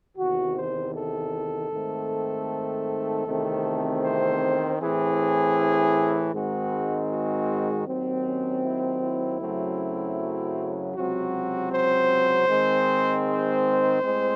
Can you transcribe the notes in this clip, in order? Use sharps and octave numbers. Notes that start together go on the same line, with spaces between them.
E2 C3 D#3 F#4
C5
A4
G#2 D#3 A3 C4
E2 C3 D#3 A3 C4
C5
A2 E3 C4 G#4
G#2 D#3 G#3 C4 F#4
F#4
D#2 D#3 F#3 C4
C#4
E4
E4
F#2 C#3 F#3 A3 C4
C#2 C3 F#3 C4 F#4
C5
G#2 D#3 G#3 C4
C5
A2 G#3 C4